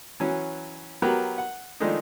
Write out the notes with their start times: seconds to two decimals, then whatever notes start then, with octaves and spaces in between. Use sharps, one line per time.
0.20 E3 F#3 C#4
1.02 F#3 B3 G4 A#4 B4
1.38 F#5
1.80 D#3 F3 G#3 A3 D4 D#4